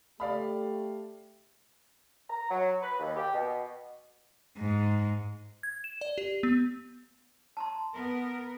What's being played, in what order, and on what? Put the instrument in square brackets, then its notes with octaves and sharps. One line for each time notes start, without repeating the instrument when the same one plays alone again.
[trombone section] A3 G4 [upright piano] D5 F5 B5
[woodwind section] A#5
F#3
B4
D#2
G4
B2
[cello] G#2
[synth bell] G#6
E7
D5
G4
B3
[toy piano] A5 A#5 C6
[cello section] B3 A#4